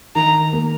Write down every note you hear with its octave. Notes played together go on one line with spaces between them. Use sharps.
D#3 A#5
A#3